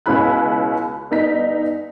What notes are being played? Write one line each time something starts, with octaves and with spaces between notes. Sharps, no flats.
C#2 B2 C#4 E4 B5 F#6
G1 D#4 B6